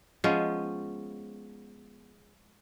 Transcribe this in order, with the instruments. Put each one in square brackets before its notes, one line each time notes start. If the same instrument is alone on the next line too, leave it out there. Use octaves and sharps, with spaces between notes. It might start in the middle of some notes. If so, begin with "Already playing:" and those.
[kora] F3 G#3 B3 C#4